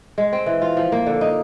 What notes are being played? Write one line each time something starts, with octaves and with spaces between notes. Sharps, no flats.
G#3
C4
E3
F4
F3
A#3
D3
D#4